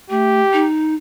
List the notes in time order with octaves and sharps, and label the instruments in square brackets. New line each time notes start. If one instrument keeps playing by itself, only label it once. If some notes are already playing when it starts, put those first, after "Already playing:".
[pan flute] A3 [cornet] G4
[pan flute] D#4